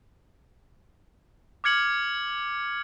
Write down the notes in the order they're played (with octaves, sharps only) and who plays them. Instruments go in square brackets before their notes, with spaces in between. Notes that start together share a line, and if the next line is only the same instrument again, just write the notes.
[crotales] D6 F6 G#6 C#7 F#7